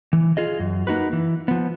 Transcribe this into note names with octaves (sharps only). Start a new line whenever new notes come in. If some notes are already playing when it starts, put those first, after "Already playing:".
E3
F4 G#4 D#5
F#2
A#3 D#4 F#4 B4
E3
F3 B3